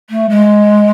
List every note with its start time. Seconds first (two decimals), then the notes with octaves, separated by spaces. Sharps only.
0.10 A3
0.30 G#3